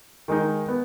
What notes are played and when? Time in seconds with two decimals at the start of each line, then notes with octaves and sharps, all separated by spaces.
0.28 D#3 G#3 D#4
0.68 B3